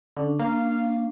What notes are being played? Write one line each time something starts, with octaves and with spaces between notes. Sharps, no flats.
D3 C#4 D4
A#3 F5